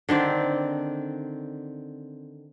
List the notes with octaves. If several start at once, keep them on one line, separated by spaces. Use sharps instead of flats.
D3 D#3 C4 D5